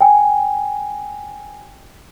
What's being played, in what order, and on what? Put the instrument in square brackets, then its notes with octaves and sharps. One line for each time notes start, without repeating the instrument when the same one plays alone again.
[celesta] G5 G#5